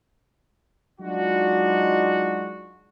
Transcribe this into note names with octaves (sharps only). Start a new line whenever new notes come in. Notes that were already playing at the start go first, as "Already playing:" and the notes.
F#3 G#3 D4 D#4 F4 F#4